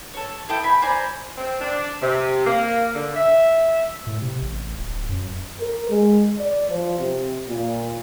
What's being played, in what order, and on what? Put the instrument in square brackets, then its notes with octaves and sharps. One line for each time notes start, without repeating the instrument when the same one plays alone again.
[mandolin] A4 C#5
E4 A4 G5 D#6
G#5 B5
C5 D5 G#5 A#5
[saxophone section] C4
D4
C3
A#3
D3
E5
[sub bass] A2
C3
A1
D1
F#2
[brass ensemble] A#4
G#3
D5
F3
C3
A#2